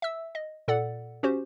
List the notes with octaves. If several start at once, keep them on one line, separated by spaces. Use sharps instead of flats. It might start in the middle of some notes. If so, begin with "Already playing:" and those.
E5 E6
D#5
A#2 A4 D5 F#5
C#4 F#4 G4 C5